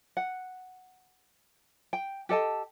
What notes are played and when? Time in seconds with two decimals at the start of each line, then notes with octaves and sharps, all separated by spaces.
0.17 F#5
1.93 G5
2.29 G4 A4 D#5 A5